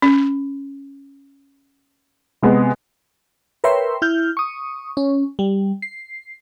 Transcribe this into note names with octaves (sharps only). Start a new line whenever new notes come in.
C#4
C3 G#3 B3
A#4 B4 C#5 E5 G5 C6
E4 F6 G6
C#6 D#6
C#4
G3
C7